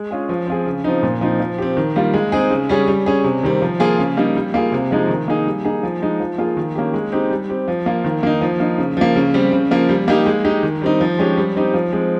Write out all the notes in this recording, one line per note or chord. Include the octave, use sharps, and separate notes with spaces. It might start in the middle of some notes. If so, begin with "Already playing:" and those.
Already playing: G#3
C#4 F4 G#4
F3
C4 F4 G#4
C#3
F3 C4 D#4
A#2
F3 C4 D#4
F3
C4 G4
D#3
G3 A#3 F4
G#3
C4 D#4 G#4
C#3
G3 C#4 G#4
G3
C#4 G#4
C3
D#3 G3 C4
F3
A#3 F4 G#4
C#3
G3 A#3 D#4
G3
A#3 F4 G#4
C3
F3 G#3 D#4
D#3
A#3 D#4 G#4
G3
A#3 D#4 G#4
F3
G#3 D#4
F3
A#3 F4 G#4
D#3
A#3 C#4 G4
G#3
C4 D#4 G4
G3
C4 G4
F3
A#3 F4
D#3
A#3 D#4
F3
A#3 D#4
C#3
F3 A#3
C#3
G3 C4 G4
C#3
F3 A#3
G3
A#3 D#4 G4
G#3
D#4 G4
D#3
G3 C4 D#4
F3
G#3 C#4 G4
G3
C4 D#4 G4
F3
G#3 C4